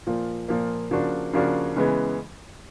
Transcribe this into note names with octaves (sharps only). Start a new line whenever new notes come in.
A#2 F3 A#3
A#2 F3 A#3
C#3 F3 A#3 D4 F#4
C#3 F3 A#3 D4 F#4
C#3 E3 G#3 B3